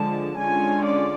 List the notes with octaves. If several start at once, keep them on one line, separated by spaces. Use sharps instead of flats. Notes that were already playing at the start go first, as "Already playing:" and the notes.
Already playing: D3 F3 G#3 A5
D3 G#3 C#4 F4 G#5
D5